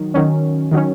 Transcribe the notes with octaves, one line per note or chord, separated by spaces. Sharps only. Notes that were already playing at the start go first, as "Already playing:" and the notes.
Already playing: D#3 F#3
D#3 F#3 C#4
D#3 F#3 C#4